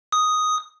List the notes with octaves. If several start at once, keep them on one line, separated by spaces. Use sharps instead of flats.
D#6